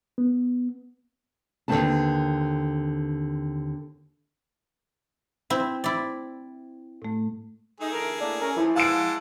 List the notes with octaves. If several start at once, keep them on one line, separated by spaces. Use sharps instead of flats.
B3
D#2 D3 A3 C4 B4 A5
C4 E4
E4 D5
A2 A3
A3 D#4 G#4
D3 E3 A#4
A2 A#3 D4
C#4 A#4
E3 F3 E4
G#3 F5 F#5 A5 E6 D7